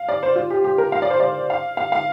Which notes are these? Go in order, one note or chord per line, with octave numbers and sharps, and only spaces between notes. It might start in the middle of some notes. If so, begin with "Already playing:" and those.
Already playing: F5
D5
C5
F4
G4
G4
A#4
F5
D5
C5
D5
F5
F5
F5